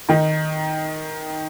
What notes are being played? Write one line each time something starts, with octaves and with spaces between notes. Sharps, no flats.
D#3 D#4